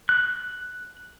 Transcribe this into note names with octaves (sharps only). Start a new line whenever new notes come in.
F#6